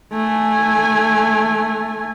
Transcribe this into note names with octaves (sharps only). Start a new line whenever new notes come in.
A3 G#5